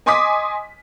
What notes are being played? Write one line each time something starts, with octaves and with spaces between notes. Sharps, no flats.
D#5 G#5 C6 D6 D#6 B6